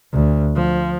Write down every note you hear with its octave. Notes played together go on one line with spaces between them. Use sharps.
D2
F3